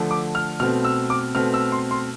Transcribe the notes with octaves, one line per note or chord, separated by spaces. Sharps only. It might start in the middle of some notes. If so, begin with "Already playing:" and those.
Already playing: D3 F3 A3 D4
D6
F6
B2 A3 C4 F6
E6
D6
B2 A3 C4 F6
E6
C6
C6